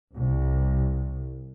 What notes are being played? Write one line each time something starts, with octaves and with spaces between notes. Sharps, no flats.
C2